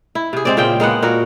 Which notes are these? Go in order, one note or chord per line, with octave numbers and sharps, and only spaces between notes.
E4
C3 G#4
G#3 C4 D5
A#2 C#3 C4 G5
G#3 A#3 B3 F#5
A#2 F#4 A#4